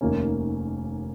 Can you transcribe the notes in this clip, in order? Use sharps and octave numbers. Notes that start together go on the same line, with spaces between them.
F1 D#2 D#3 A#3 C#4